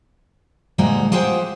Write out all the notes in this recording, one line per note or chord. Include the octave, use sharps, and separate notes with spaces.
D2 A#2 G3 G#3 F#5 A#5
F4 G4 G#4 C5 F#5 G5